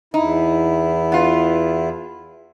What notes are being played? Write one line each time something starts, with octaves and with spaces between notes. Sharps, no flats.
E2 D#4 E4
B3 F4